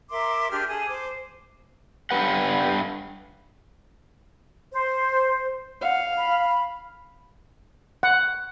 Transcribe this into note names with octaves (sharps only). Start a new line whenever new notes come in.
A#4 E5 C6 D6
D4 G4 G#4 F6
G#4 A4
C5 D6
G2 G4 B4 F#5
C5
F5 F#5
B5
F#5